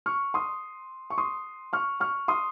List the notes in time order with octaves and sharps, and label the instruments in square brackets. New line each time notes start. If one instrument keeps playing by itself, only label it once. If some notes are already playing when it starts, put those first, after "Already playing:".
[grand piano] C#6 F6
C6 D#6
C#6
C6 D#6
C#6 F6
C#6 F6
C6 D#6